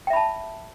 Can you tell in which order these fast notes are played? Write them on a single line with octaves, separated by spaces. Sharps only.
G5 E5 B5 A5